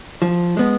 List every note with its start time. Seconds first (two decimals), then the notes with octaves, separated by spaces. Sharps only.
0.22 F3
0.57 G#3 B3